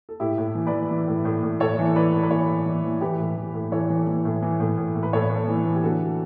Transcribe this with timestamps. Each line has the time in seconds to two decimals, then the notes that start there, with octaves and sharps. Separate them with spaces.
0.09 A4
0.20 A2 E4 G4
0.38 A2
0.55 E3
0.67 B4 D5
0.73 E3
0.91 E3
1.08 A2
1.25 A2
1.43 A2
1.60 A2 A4 C#5
1.79 E3
1.96 E3 B4 D5
2.13 A2
2.23 B4
2.31 E3 A4 C#5
2.48 A2
2.66 E3
2.84 E3
3.01 E3 G4 B4
3.19 A2
3.37 E3
3.54 A2
3.72 E3 A4 C#5
3.90 E3
4.07 E3
4.25 A2
4.42 E3
4.60 A2
4.78 A2
4.95 A2
5.03 B4
5.13 A2 A4 C#5
5.30 A2
5.48 E3
5.65 E3
5.75 G4
5.83 D3 F#4 A4